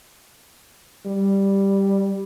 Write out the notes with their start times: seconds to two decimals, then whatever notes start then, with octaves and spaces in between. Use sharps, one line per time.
1.06 G3